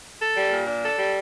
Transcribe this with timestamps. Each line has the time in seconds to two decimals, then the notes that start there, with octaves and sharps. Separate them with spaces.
0.20 A4
0.36 G3
0.51 A#2
0.67 D4
0.83 A4
0.98 G3